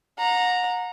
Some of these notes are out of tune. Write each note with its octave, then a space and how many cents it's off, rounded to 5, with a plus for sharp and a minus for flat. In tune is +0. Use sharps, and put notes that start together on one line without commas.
F#5 -35 A#5 -5